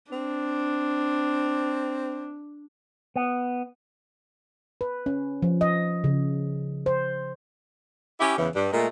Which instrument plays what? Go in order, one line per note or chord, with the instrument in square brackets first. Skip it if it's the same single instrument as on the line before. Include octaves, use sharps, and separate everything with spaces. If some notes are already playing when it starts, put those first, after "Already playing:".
[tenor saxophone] C4 [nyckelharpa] D4
[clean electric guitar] B3
[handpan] B4
C#4
F3
D#5
C#3
C5
[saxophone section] C#4 E4 G4
E2 C#3 E3
G2
A#2 G#3 A3 A#4